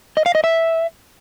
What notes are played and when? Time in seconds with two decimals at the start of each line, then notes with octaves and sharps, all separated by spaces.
0.17 D#5
0.26 F5
0.35 D#5
0.44 E5